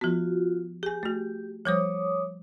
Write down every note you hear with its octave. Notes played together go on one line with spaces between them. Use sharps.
F3 B3 F4 F#4
G4 G#4 G#5
A3 F#4
F3 G3 C5 C#5 D6 D#6